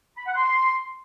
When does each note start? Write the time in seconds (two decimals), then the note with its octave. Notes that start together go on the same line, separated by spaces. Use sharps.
0.17 B5
0.27 F#5
0.36 C6